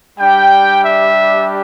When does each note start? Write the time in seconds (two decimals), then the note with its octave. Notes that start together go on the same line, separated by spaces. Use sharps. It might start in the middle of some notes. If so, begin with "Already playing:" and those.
0.20 G3 D4 G4 G5
0.85 E5